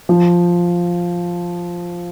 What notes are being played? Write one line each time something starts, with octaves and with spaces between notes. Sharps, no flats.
F3